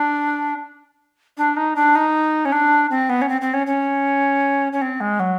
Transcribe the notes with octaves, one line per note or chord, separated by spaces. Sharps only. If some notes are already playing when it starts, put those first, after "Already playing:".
Already playing: D4
D4
D#4
D4
D#4
C#4
D4
C4
B3
C#4
C4
C4
C#4
C#4
C#4
C4
G#3
F#3